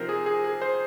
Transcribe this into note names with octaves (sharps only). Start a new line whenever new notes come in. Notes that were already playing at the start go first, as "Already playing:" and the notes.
Already playing: C3 F3 C4 D#4 A#4 C5
G#4
G#4
G#4
C5